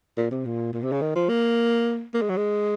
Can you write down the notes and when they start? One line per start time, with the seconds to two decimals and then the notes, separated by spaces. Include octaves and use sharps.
0.17 A#2
0.31 C3
0.45 A#2
0.73 A#2
0.83 C3
0.92 C#3
1.01 D#3
1.15 F3
1.29 A#3
2.14 A#3
2.21 G#3
2.29 F#3
2.37 G#3